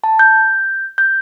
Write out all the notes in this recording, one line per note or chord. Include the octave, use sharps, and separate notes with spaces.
A5
G6
G6